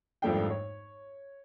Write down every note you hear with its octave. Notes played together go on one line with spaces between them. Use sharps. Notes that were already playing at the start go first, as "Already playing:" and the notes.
G#1 F2 G3 A3 D4 G5
C#5